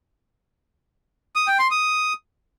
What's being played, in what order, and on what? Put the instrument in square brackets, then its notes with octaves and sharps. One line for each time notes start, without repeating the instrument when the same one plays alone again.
[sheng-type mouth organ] D#6
G5
C6
D#6